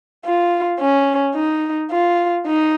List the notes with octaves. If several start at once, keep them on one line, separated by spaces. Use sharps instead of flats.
F4
C#4
D#4
F4
D#4